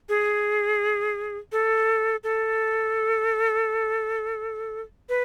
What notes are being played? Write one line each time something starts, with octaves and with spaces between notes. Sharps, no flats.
G#4
A4
A4
B4